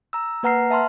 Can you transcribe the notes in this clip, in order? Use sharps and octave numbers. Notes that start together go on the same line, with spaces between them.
A#5 E6
A#3 B4 F#5 A#5 F6 C7
E5 A5 B5 C6 F6